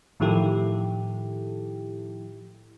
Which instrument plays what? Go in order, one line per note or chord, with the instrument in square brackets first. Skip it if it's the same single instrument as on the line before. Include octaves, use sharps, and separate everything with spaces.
[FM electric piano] A2 D#3 F3 E4 G4 A4